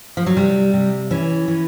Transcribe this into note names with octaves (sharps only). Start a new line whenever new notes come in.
F3
F#3
C3 G3
C3
E3 C#4
E3